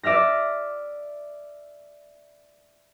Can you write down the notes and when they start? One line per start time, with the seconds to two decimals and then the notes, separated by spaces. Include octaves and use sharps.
0.03 D5 E5 F6 A#6